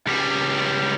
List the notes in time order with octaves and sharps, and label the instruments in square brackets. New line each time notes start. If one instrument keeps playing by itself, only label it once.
[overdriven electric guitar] C#2 G3